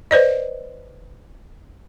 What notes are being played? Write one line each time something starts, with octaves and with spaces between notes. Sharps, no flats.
B4 C5 D5 D#5